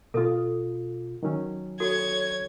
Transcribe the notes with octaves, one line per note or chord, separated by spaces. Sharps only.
B2 F4 A4 D#6
D#3 F#3 C#4
F#4 A4 C#5 G#6